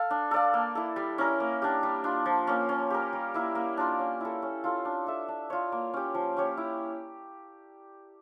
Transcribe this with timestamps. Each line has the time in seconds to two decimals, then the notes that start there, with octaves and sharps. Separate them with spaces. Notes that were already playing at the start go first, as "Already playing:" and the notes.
Already playing: A4 F5
0.10 D4
0.31 A4 D5 F5
0.54 A#3
0.75 E4 A4
0.96 G3
1.18 C#4 E4 A#4
1.40 A#3
1.62 D4 G4
1.83 G3
2.04 D4 F4
2.26 F3
2.47 A#3 C#4
2.69 C#4
2.90 G4 A#4
3.13 G3
3.34 A#3 E4 A#4
3.55 A#3
3.77 D4 F4 A#4
3.99 C#4
4.21 E4 A4
4.42 C#4
4.64 F4 A4
4.85 D4
5.07 A4 E5
5.28 D4
5.50 F4 C#5
5.72 A#3
5.94 C#4 G4
6.14 F3
6.37 C#4 G4 C#5
6.57 E4